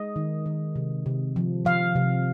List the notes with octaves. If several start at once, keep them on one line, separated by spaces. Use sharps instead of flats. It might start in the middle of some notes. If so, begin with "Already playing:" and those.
Already playing: G#3 D#5
D#3
D#3
C3
C3
F3
F3 F5
C3